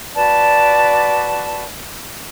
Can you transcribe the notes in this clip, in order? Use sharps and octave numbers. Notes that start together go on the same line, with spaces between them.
F#4 B4 D5 A5